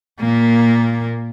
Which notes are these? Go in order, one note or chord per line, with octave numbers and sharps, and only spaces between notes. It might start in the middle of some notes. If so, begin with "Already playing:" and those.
A#2 A#3